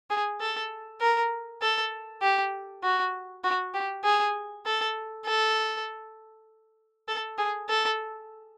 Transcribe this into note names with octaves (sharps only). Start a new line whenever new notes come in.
G#4
A4
A#4
A4
G4
F#4
F#4
G4
G#4
A4
A4
A4
G#4
A4